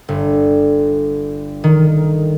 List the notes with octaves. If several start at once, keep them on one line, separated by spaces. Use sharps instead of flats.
G1
D#3